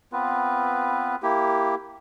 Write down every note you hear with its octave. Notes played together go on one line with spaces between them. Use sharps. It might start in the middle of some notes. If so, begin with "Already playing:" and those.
B3 C4 F4 B4
A#3 E4 G4